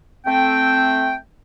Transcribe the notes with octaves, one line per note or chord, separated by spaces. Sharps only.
A3 C4 G5